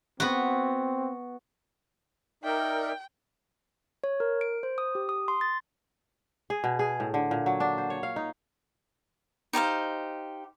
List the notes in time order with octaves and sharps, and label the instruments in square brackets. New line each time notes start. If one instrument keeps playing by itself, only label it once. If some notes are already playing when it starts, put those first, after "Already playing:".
[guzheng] B3 F#4 [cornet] C4
[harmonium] D#4 D5 E5 [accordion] A#4 [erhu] G5
[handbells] C#5
A#4
D7
C5
D#6
G4
D#6
C6
A6
[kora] G#4
B2
G#4
A2
D3
A#2
F#3
D4
C5
C#5
F5
D#4
[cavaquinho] D#4 G4 C5 F5